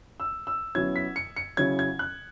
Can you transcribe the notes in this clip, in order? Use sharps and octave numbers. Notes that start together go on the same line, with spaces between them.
E6
E6
B2 F#3 C#4 E4 G#6
B6
C#7
C#7
C#3 F#3 C#4 E4 G#6
G#6
F#6